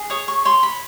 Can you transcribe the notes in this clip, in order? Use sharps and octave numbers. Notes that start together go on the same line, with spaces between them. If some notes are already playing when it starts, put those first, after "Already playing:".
Already playing: G#4
C#5 D#6
C#6
C#5 C6
B5